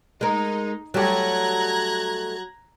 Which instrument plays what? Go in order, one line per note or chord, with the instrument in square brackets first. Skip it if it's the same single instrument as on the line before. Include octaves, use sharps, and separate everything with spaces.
[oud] G#3 A#4 [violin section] D#4
[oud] F#3 G4 [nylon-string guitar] G3 A3 [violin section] A#5 F#6 G#6